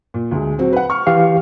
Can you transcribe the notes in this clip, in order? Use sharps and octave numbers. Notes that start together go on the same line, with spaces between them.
A#2
D2 G#3
F#3 C4 F#4
B4 F#5
C#6 F6
E3 G4 F5